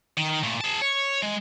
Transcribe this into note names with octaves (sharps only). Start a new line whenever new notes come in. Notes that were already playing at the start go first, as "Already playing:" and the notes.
D#3
A#2 A3
G#4 A5
C#5
G#3